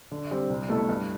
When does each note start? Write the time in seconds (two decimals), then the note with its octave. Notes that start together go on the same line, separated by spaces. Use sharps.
0.12 D3
0.31 G3 C4
0.50 C2
0.69 B2 A3 E4 A4
0.89 G2